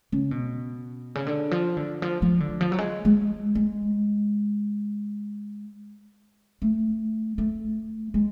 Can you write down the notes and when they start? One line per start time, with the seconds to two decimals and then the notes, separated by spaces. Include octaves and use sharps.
0.12 C#3
0.31 B2
1.15 C#3
1.26 D3
1.51 F3
1.77 D3
2.02 F3
2.22 F3
2.40 D3
2.61 F3
2.72 F#3
2.79 G#3
3.05 G#3
3.55 G#3
6.62 A3
7.38 A3
8.14 G#3